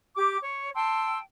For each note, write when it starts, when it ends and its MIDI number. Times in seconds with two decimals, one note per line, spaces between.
0.15 0.35 67
0.15 0.35 86
0.41 0.68 73
0.74 1.19 79
0.74 1.19 81
0.74 1.19 84
0.74 1.19 88